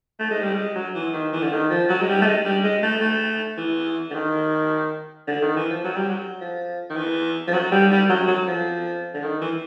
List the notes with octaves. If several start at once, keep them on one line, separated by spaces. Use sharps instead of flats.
A3
G#3
G3
G#3
F#3
E3
D#3
E3
D3
D#3
F3
F#3
G#3
G3
A3
G#3
G3
G#3
A3
A3
E3
D3
D#3
D3
D#3
E3
F3
F#3
G3
F#3
F3
D#3
E3
F3
F#3
G3
G3
F#3
F#3
F3
D3
D#3
E3